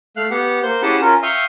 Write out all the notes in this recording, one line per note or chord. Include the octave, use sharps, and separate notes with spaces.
A3 F5 F#6
B3 G4 F#5
A#3 C5 G6
C#4 E4 G4 G#4 F#5 A5
C#4 F4 A#4
E5 F5 G5 C#6 D#6